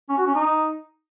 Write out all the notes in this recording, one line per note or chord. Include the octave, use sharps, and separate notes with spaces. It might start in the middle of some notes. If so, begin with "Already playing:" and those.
C#4
F#4
C#4
D#4